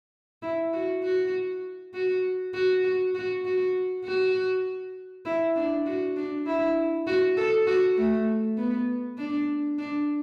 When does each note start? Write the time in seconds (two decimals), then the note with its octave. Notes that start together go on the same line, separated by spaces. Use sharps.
0.42 E4
0.73 F#4
1.03 F#4
1.94 F#4
2.54 F#4
2.84 F#4
3.15 F#4
3.45 F#4
4.05 F#4
5.26 E4
5.56 D4
5.86 F#4
6.17 D4
6.46 E4
7.07 F#4
7.37 A4
7.67 F#4
7.97 A3
8.57 B3
9.18 D4
9.78 D4